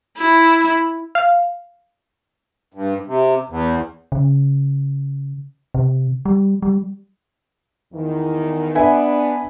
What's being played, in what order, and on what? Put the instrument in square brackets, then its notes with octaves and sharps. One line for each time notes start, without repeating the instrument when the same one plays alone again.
[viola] E4
[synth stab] F5
[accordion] G2
C3
E2
[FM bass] C#3
C3
G3
G3
[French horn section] E2 D#3 E3
[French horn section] B3 D4 [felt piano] B4 E5 G#5